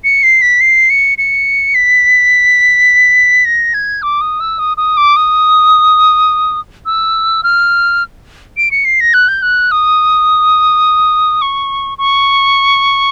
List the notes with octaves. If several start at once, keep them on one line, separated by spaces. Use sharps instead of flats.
C#7
C7
B6
C7
C#7
C#7
B6
A#6
G#6
D6
D#6
E6
D#6
D#6
D6
D#6
E6
F6
D7
C#7
C7
A#6
F#6
G6
F#6
D#6
C#6
C#6